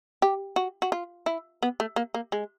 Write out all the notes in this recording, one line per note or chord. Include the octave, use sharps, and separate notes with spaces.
G4
F#4
F#4
F4
E4
B3
A3
A#3
A#3
G#3